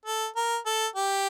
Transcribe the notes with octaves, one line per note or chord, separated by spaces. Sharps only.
A4
A#4
A4
G4